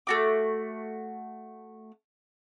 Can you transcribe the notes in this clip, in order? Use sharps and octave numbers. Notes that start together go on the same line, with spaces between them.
A3 F#4 D6